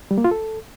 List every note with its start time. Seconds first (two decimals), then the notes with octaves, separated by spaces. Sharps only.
0.11 G3
0.18 A#3
0.24 F4
0.31 A4